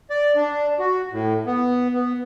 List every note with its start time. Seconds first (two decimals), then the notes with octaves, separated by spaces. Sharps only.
0.10 D5
0.36 D4
0.79 F#4
1.12 A2
1.46 B3
1.94 B3